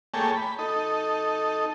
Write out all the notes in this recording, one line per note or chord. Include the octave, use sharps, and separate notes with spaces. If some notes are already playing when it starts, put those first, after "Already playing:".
A3 A#3 G#4 C#5 G5 A5
B5
D#4 A4